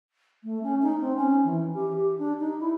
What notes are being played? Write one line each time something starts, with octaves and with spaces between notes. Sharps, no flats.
A3
C#4
D#4
C4
C#4
E3
G4
G4
D4
D#4
E4